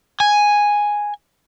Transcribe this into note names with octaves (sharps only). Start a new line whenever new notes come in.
G#5